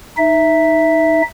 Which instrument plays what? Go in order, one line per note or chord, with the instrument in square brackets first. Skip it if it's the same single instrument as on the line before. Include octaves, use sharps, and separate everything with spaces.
[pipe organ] D#4 E5